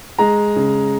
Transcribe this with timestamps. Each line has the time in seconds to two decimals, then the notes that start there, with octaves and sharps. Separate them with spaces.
0.19 G#3 A#5
0.56 C#3